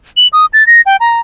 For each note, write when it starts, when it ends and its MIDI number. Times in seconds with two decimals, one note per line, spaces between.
0.17 0.27 102
0.33 0.46 87
0.53 0.66 93
0.67 0.81 94
0.86 0.96 79
1.00 1.20 82